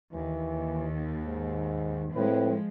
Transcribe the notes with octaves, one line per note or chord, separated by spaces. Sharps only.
D#2 E3
G#2
A2 F3 G#3 C4 B4